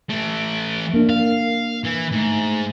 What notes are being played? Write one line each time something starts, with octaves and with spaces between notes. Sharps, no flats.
E3 A3 D7
A#3 D4 A#4
F5
E3
G#2 A3